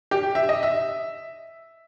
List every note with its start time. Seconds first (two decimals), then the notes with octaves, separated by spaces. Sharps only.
0.11 G4
0.35 E5
0.49 D#5
0.63 E5